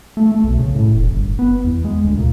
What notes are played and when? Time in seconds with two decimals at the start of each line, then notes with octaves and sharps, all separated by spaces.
0.17 A3
0.32 A3
0.44 B1
0.58 C#3
0.75 A2
0.94 E1
1.09 G1
1.39 B3
1.64 E2
1.85 G#3
2.04 D2
2.17 A#2